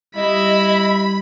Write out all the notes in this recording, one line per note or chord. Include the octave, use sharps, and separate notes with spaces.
G3 E4 D#5 B5